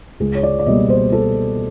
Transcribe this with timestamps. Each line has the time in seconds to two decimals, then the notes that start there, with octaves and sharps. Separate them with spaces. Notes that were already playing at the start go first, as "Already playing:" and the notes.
0.20 C#2 G#4
0.35 C#5
0.43 D5
0.59 D5
0.66 B2 G3 A#3 D#5
0.90 C5
1.12 A4